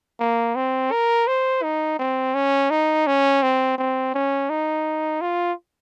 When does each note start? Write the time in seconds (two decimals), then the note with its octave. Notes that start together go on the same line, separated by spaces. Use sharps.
0.20 A#3
0.56 C4
0.91 A#4
1.27 C5
1.63 D#4
1.99 C4
2.35 C#4
2.70 D#4
3.07 C#4
3.43 C4
3.78 C4
4.14 C#4
4.50 D#4
5.21 F4